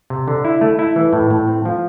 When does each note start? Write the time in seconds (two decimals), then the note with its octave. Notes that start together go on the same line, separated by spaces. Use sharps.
0.10 C3
0.28 D3
0.45 E4
0.61 A3
0.79 E4
0.96 E3
1.13 A2
1.31 A2
1.48 C4
1.65 F3